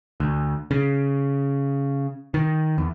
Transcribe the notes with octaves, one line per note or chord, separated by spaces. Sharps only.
D2
C#3
D#3
E2